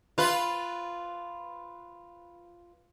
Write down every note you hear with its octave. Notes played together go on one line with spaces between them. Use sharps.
F4 B4